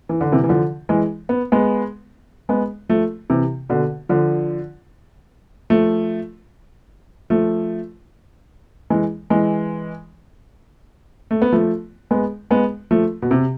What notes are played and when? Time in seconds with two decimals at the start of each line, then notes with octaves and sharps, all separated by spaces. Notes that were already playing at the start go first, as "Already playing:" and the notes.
0.09 E3
0.21 D3
0.32 C3 E3
0.44 E3
0.49 D3 F3
0.89 E3 G#3
1.29 B3
1.52 G#3 B3
2.49 G#3 B3
2.89 F3 A3
3.30 C3 E3
3.69 B2 D3
4.09 D3 F3
5.70 F3 A3
7.30 F3 A3
8.90 E3 G#3
9.30 E3 G#3
11.31 A3
11.42 B3
11.52 F3 A3
12.11 G#3 B3
12.51 G#3 B3
12.91 F3 A3
13.22 B2
13.31 C3